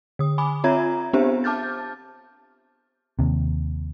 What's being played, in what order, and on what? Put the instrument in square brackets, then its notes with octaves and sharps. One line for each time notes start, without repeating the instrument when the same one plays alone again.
[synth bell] D3 D#6
G#5 B5 D6
C4 F4 C#5 E5 A#5 G#6
B3 C4 D4 G4 C5 E5
A5 D6 F6 G6 A6
[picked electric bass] D#2 C3